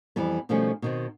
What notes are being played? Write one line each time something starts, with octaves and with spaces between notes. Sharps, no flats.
F2 E3 G3 B3
B2 D#3 F3 G3 A3 C#4
B2 D#3 C4